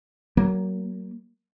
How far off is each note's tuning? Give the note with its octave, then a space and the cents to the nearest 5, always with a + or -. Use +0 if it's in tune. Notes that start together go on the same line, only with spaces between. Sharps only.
F#3 +25 A#3 +0